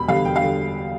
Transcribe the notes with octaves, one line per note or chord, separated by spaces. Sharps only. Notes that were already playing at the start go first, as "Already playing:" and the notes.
Already playing: E1 B5
E2 D3 G3 F5
E1 G5
F5
D3 G3